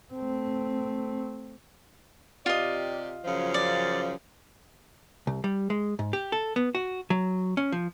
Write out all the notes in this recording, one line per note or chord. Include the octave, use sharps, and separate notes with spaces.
A3 C4
C3 F4 G4 D5 D#5
F#2 C#3 F3
D5
C2
G3
G#3
G#2
G4
A4
B3
F#4
F#3
C#4
F3